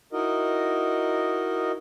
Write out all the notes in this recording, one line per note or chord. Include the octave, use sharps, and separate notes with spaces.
D#4 E4 F#4 A#4 D#5